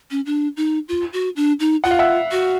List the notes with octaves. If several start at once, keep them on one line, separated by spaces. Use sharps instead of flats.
C#4
D4
D#4
F4
F#4
D4
D#4
F4 F#5
F5
E5 F#5
F#4